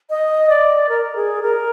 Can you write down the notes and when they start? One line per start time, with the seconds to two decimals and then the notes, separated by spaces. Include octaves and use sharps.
0.10 D#5
0.50 D5
0.89 A#4
1.16 G#4
1.42 A#4